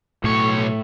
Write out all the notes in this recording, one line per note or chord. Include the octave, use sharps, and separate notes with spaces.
B1 A2 C#5